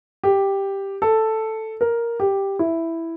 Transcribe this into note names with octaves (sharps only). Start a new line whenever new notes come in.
G4
A4
A#4
G4
E4